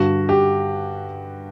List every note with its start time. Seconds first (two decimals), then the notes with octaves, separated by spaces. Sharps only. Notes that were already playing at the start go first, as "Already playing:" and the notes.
Already playing: G2 D3 F#4
0.29 G4